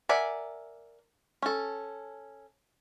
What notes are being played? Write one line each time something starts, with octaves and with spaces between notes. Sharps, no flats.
A#4 D5 E5 F#5 G#5
C#4 A4